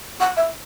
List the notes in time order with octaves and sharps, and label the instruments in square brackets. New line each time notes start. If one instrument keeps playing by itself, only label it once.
[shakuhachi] F#5
E5